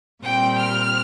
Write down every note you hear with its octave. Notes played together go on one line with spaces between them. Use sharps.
A#2 G3 C4 G5
F6